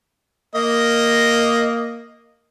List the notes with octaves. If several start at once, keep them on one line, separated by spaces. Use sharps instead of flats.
A#3 D#5